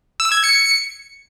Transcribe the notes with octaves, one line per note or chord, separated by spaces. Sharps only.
E6
G#6
C#7